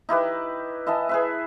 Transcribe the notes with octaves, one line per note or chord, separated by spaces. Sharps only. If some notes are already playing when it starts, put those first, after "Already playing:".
D#4 E4 G4 B4
E4 D#5 G#5 A5
G#4 B4 E5